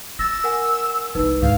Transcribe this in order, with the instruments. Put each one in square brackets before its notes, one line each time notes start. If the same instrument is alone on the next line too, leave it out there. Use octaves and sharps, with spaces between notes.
[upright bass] F4 [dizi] E6 [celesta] A6 A#6
[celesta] A#4 F#5 G#5
[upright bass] C2 G#3 [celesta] D#4 B4 E6
[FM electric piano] D2 G#2 [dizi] F5